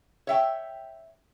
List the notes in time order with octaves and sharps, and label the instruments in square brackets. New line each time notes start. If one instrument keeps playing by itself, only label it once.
[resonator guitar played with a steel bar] C#5 E5 G5